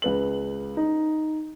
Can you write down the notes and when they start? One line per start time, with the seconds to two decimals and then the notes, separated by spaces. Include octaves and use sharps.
0.02 C#2 B4 F#7
0.77 D#4